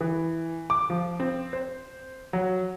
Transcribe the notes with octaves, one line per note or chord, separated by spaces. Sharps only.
E3
D6
F3
C4
C5
F#3